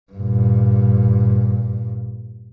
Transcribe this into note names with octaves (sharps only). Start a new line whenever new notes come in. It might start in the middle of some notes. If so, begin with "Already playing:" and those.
G2 A#2